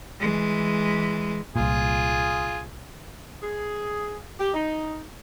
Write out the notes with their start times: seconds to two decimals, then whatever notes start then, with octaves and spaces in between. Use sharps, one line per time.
0.20 E3 G#3
1.56 C2 A#2 F4 G#4
3.42 G#4
4.39 G4
4.53 D#4